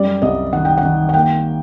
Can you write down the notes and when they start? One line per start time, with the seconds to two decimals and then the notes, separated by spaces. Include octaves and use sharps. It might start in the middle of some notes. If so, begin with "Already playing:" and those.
Already playing: F#2 G3 D5
0.22 C2 D#5
0.53 D#3 F#5
0.65 G5
0.78 F#5
0.83 D#3
1.09 F#5
1.14 A#3 G5